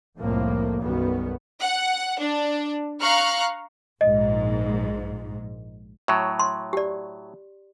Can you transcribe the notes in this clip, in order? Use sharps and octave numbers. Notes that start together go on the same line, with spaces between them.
C2 F2 A2 F3 A#3
B1 F#2 D#3 G3 B3
F#5
D4
F5 A#5 C#6 F6 F#6
A#1 G#2 D#5
A2 F#3
C6
G4 D5